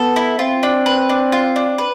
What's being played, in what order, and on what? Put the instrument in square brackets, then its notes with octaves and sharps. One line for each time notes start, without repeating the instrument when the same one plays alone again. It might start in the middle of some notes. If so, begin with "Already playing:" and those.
Already playing: [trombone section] B3 [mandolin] A4
[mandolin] E4
[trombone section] C4 [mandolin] F4
[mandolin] D4
B4
D4
F4
D4
B4